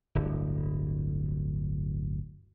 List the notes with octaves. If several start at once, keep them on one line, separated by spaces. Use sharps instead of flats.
D1 G1